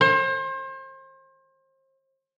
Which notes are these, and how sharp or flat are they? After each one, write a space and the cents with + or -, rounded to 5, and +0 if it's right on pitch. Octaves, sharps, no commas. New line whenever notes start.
C5 +35